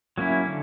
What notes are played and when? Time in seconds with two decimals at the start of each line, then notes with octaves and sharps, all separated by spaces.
0.18 F#3 A#3 C#4 E4
0.45 D3